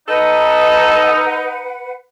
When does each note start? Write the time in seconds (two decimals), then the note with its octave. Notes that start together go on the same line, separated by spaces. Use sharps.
0.08 D#4 A4 B4 F#5